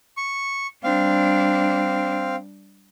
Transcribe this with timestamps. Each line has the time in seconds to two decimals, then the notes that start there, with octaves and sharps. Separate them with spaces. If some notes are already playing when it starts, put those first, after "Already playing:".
0.17 C#6
0.84 G3 C4 D4 F5